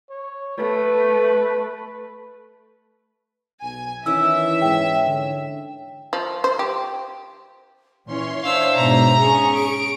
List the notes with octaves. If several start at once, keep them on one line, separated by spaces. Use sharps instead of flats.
C#5
A3 B4
B1 G#5
D#3 E3 C#4 E4 E5 E6
G#2 C#4 G5
D3
F3
C5
G4
A#2 E3 C#4 C#5 C6
D4 C5 E5 F5 E6
G#2 B2 A#5
C#4 G#4 C#6
D7